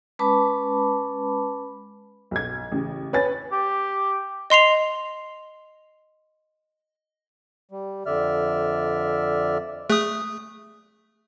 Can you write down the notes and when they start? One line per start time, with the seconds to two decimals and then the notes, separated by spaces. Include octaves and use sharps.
0.19 G#3 C#4 B4 A5 B5 D6
2.31 B1 G#6
2.72 A1 C#3
3.13 B4 C#5 G#5 A6
3.52 G4
4.50 D#5 C6 C7 F7
7.71 G3
8.06 F2 D3 D5 E5 F6
9.90 A3 G#4 D#6 F#6